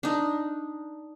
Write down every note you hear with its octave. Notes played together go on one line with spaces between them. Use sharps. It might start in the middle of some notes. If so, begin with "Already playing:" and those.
D4 D#4